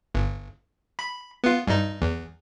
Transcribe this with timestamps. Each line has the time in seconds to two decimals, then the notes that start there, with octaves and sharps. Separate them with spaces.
0.15 G1
0.99 B5
1.44 B3 F4
1.67 G2 D#4
2.02 E2